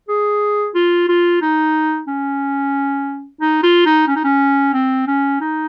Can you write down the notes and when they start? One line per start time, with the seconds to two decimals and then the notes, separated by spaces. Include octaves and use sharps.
0.08 G#4
0.75 F4
1.08 F4
1.41 D#4
2.07 C#4
3.41 D#4
3.63 F4
3.85 D#4
4.07 C#4
4.16 D#4
4.24 C#4
4.74 C4
5.07 C#4
5.41 D#4